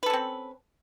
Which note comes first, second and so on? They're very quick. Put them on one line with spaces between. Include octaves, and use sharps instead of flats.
B4 A4 C#4 C4